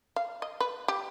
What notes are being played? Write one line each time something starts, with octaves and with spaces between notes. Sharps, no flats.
F5
D#5
B4
G4